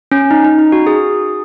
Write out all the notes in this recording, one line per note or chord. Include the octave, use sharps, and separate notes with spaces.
C#4
D#4
D#4
D#4
F#4
G#4